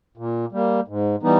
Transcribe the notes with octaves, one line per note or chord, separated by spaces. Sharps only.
A#2
G3 A#3
G#2
E3 G3 B3 D#4